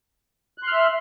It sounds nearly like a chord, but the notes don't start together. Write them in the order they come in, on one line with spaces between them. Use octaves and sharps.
F#6 C6 F6 E5